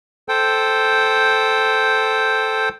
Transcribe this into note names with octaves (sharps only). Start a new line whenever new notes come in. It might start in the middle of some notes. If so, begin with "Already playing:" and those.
A4 C5 G5